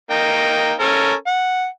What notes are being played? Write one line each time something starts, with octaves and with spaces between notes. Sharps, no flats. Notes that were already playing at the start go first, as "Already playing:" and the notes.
A#3 D#4 G5
C#4 A4 A#4
F#5